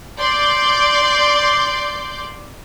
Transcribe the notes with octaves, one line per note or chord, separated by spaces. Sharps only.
D5 C6 D6 G6